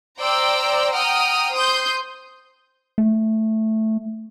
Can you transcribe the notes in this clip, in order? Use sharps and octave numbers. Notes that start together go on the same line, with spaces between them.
C5 D5 G5 A#5 E6
F#5 G5 A#5 D#6 F6
C5 C6 D#6 G6
A3